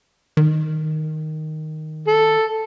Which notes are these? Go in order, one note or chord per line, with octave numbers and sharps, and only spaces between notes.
D#3
A4